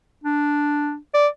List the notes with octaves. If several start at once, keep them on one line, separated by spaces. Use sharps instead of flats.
D4
D5